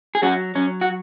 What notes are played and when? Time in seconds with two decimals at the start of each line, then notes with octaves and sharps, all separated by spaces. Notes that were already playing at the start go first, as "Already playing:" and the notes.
0.15 G#4
0.22 F#3 C#4 F#4
0.55 F#3 C#4
0.81 F#4